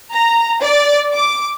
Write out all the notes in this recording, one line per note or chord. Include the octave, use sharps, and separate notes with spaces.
A#5
D5
D6